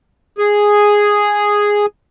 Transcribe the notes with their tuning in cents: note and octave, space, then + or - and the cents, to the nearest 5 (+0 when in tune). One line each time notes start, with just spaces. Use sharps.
G#4 -5